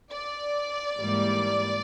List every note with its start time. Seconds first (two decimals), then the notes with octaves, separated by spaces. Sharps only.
0.12 D5
0.99 G#2 E3 G3 A#3